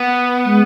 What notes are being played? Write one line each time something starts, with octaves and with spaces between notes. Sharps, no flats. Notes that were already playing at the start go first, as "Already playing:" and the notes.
Already playing: B3
G#3